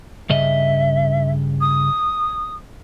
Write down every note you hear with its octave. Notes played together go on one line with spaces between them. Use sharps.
G2 C#3 D#5 E5
D#6